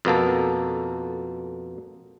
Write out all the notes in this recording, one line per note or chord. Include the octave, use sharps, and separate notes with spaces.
F2 B2 A#3 A4